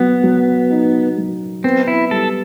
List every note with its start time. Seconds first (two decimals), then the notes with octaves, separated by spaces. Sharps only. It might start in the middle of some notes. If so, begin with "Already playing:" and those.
Already playing: F#3 B3
0.23 F#3
0.70 D#4
1.18 F#3
1.64 B3 C4
1.88 E4
2.11 G3 A4